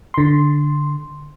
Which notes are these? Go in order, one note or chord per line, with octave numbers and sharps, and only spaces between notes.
D3 C6